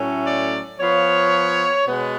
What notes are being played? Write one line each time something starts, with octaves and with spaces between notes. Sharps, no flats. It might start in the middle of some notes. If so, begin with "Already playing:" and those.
Already playing: A2 F#3 A3 C#4
D5
F3 B3 F4 C#5
B2 G#3 B3